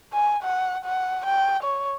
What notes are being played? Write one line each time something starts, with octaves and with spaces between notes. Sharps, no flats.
G#5
F#5
F#5
G5
C#5